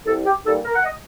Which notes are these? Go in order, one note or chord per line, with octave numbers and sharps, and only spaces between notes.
C2 A4
G4
A#2 G3 A#3 D#4 A4
A#4
F#5
D#5